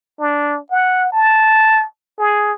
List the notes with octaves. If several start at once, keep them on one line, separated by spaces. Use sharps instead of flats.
D4
F#5
A5
G#4